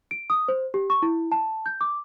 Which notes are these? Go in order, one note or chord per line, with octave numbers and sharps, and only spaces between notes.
D7
D#6
C5
G4
C#6
E4
A5
G6
D6